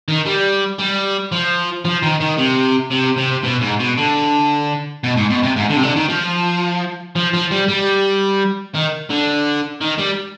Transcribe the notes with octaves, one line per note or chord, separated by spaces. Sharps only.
D#3
G3
G3
F3
F3
D#3
D#3
C3
C3
C3
B2
G#2
B2
D3
B2
G#2
B2
C3
G#2
D3
C3
D3
D#3
F3
F3
F3
G3
G3
D#3
D3
D#3
G3